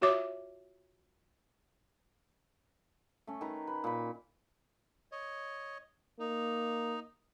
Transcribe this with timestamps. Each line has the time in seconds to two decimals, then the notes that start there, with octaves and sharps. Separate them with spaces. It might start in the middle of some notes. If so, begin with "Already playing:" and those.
0.01 F4 F#4 C#5 E5 D6
3.27 A3 C#4
3.41 D#3 B4 A#5
3.67 B4
3.84 A#2 B5
5.12 C#5 D#5
6.20 A#3 D#4